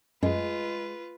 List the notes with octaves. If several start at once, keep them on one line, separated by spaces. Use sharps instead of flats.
F#2 G#3 F4 B4